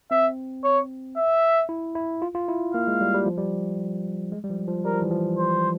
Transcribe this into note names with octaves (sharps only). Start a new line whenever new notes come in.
C4 E5
C#5
E5
E4
E4
F4
F4
E4
A#3 F5
G#3
G3
G3
F3
G3
G#3
G3
F3
F3
G3 A#4
F3
E3
F3
C5